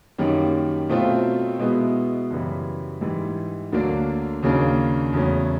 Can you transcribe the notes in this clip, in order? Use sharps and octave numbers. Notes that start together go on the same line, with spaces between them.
F#2 D#3 G3 A#3 C#4
B2 F#3 A3 C4 F4
B2 G#3 B3 E4
F#2 C#3 E3 G3
G#2 E3 G3
D2 D3 F#3 A#3 D4
D#2 C#3 F#3 A#3 D4
E2 C#3 F#3 A3 C#4